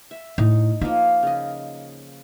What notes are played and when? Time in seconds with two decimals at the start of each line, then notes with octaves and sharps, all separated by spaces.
0.11 E5
0.38 A2 D#4
0.81 F3 A#3 D#4
1.23 C#3 D#5